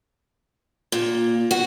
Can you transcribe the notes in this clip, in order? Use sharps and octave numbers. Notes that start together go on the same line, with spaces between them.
A#2
F#4